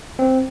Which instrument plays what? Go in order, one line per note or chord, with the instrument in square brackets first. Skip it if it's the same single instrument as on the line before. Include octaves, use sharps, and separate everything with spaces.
[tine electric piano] C4